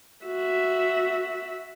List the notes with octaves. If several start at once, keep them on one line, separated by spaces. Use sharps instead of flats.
F#4 E5